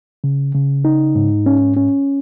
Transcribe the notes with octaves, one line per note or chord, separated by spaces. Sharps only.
C#3
C#3
D#4
G#2
C#4
C#4